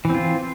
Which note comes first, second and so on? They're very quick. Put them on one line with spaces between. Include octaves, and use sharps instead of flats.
E3 C4 F4